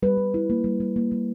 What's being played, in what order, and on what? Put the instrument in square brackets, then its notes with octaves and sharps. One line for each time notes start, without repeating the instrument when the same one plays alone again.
[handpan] G3 B4
G3
E4
A#3
G3
G3
A#3
G3